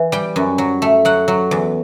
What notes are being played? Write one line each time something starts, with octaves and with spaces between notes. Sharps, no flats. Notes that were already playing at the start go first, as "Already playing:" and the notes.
Already playing: E3
G3 G5
F#2
F#3
A3
F#3 F#5
F#3
E2